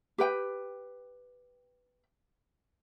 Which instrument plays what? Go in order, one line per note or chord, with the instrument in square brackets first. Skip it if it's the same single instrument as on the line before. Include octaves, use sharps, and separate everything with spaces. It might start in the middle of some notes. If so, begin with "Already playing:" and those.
[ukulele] G4 B4 G5